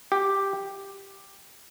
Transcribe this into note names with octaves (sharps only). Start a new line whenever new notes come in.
G4